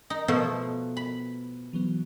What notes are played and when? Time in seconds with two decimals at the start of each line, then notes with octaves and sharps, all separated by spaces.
0.10 D#4
0.28 B2 F3 A3 B3
0.97 B5
1.73 E3 F#3 B3